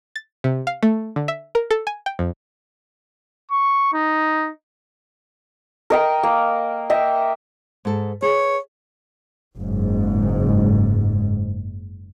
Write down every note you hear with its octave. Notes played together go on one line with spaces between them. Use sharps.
A6
C3
F5
A3
D3
E5
A#4
A4
G#5
G5
F2
C#6
D#4
A#4 D#5 G5
A#3
D#5 E5 G5
G#2 A4
G#4 B4 C#5
F#1 G#2